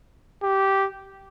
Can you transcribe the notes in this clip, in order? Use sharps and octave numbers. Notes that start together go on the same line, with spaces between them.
G4